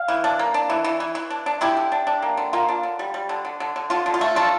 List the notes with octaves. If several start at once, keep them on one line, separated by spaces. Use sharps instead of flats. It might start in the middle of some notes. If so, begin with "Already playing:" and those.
Already playing: F5
E3
D4
A#3
D4
E3
E3
E3
E3
D4
D4
D4 E4 G4
D3
D4
D4
A#3
D3
A#3 F4
D4
D3
G3
G3
D3
D3
D3
D3
D3 F4
D3
F4
A3
D4 F4 A4